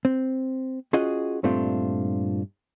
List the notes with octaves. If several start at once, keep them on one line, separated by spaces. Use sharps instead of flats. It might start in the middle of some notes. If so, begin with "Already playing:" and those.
C4
C#4 F4 F#4 G#4 D#5
G2 A#2 A3 C4 D4 F4